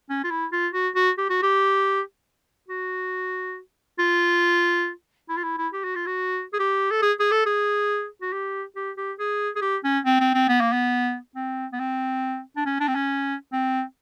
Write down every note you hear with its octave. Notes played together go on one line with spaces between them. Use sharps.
C#4
F4
E4
F4
F#4
F#4
G4
F#4
G4
F#4
F4
E4
F4
E4
E4
G4
F#4
F4
F#4
G#4
G4
A4
G#4
G#4
A4
G#4
F#4
G4
G4
G4
G#4
G#4
G4
C#4
C4
C4
C4
B3
A#3
B3
C4
B3
C4
D4
C#4
D4
C4
C#4
C4